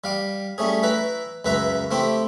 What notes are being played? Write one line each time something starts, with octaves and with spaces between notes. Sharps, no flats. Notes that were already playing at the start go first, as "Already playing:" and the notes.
G3 F5 D6
G3 A3 C#4 G#4
E4 B4 A#5
C#2 F#2 B4 E5 A#5
A3 C4 E4 G4